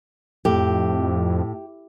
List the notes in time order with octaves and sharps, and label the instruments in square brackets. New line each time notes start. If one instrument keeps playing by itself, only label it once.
[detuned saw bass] F2 [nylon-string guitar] A2 [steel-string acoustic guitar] G4